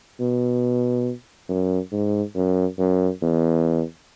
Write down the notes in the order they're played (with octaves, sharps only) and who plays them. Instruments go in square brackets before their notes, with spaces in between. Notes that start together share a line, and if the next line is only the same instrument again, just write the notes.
[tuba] B2
F#2
G#2
F#2
F#2
E2